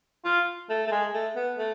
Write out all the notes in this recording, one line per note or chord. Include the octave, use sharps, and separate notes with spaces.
F4
A3
A3
G#3
A3
B3
A3